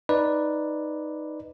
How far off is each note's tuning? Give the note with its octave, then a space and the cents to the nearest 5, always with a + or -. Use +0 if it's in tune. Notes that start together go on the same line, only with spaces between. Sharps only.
D#4 +0 B4 +0 D5 +0